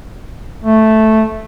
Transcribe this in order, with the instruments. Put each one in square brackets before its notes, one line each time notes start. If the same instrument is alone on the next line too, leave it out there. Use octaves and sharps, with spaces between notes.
[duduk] A3